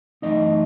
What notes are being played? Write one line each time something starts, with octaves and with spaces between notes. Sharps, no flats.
F#2 E3 A3 D#4 D#5